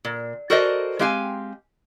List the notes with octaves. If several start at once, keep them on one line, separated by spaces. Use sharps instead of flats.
A#2
F#4 A4 A#4 C5 D5 D#5
G#3 C4 G4 F5 F#5 G#5